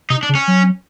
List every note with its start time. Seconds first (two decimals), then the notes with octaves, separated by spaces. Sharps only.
0.10 C3 D#4
0.23 D4
0.29 C#3
0.35 C#4
0.48 F#3